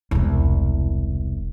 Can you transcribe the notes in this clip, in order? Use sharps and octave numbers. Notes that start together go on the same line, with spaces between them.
E1 C2